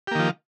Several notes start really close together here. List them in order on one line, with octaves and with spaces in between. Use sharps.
G4 A#3 D#3 F3